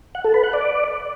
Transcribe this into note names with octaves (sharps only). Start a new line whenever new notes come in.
F#5
A4
B4
F#5
D5